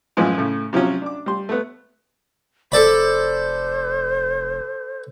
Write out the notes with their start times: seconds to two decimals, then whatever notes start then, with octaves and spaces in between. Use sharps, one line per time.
0.17 F#2 A2 E3 F3 G#3
0.38 A2 C#3 A3
0.73 C3 F3 F#3 C#4
1.02 D4 D6
1.26 G3 C6
1.49 A3 B3
2.72 F1 A4 C5 D5 B5